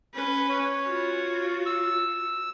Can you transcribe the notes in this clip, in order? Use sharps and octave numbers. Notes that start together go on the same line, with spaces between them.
C#4 B4
C#5
F4 F#4
E6